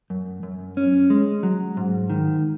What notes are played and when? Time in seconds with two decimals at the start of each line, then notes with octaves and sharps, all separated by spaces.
0.10 F#2
0.43 F#2
0.77 C#4
1.10 G#3
1.43 F#3
1.77 G#2
2.10 D#3